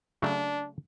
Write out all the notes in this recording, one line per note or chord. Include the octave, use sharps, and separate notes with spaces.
C#3 F#3 A3 D4